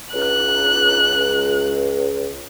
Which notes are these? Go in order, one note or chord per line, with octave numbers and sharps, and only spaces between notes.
C#2 F#6